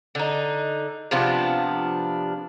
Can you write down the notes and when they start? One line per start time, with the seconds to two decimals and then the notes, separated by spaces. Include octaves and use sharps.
0.15 D3 D#4
1.11 C3 F3 B3 D4